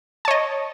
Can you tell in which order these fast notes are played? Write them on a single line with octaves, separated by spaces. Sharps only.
A5 C#5 D#5